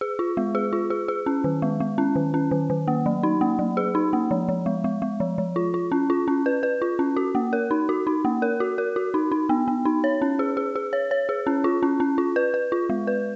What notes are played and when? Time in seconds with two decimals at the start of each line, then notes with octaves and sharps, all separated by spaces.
0.01 G#4
0.19 F4
0.37 G#3
0.55 G#4
0.73 F4
0.90 G#4
1.08 G#4
1.26 C#4
1.44 D#3
1.62 G#3
1.80 G#3
1.98 C#4
2.16 D#3
2.34 C#4
2.51 D#3
2.70 D#3
2.88 A#3
3.06 F#3
3.23 D#4
3.41 A#3
3.59 F#3
3.77 G#4
3.95 D#4
4.13 A#3
4.31 F3
4.49 F3
4.66 G#3
4.84 G#3
5.02 G#3
5.20 F3
5.38 F3
5.56 F4
5.74 F4
5.92 C#4
6.10 F4
6.28 C#4
6.46 B4
6.63 B4
6.82 F4
6.99 C#4
7.17 F#4
7.35 A#3
7.53 A#4
7.71 D#4
7.89 F#4
8.07 D#4
8.25 A#3
8.42 A#4
8.60 F#4
8.78 A#4
8.96 F#4
9.14 D#4
9.32 D#4
9.49 B3
9.68 B3
9.85 D#4
10.04 C#5
10.22 C#4
10.39 G#4
10.57 G#4
10.76 G#4
10.93 C#5
11.11 C#5
11.29 G#4
11.47 C#4
11.64 F4
11.83 C#4
12.00 C#4
12.18 F4
12.36 B4
12.54 B4
12.72 F4
12.90 G#3
13.07 B4